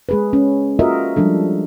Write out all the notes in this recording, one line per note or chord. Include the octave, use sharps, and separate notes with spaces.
G#3 G#4 B4
C#4
F4 F#4 A#4 D#5 E5
F3 G3 G#3 D4 A4